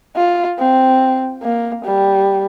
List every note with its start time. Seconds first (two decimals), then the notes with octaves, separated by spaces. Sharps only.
0.16 F4
0.59 C4
1.43 A#3
1.85 G3